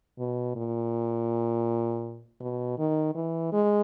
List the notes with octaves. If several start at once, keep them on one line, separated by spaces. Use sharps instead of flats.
B2
A#2
B2
D#3
E3
G#3